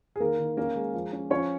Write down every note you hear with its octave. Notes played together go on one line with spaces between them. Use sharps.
G#4
D#3 A#3 A#4
D#3
A#3 C#4 A#4
G#3
F3
C#4
F3 C#4 C#5